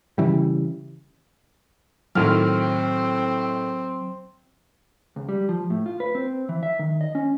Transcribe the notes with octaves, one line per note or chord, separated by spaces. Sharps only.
C#3 E3 G3
A2 D#3 F#3 C4 F6
C#2
G3
F3
A2
F4
B4
C4
E3
E5
D#3
D#5
C#4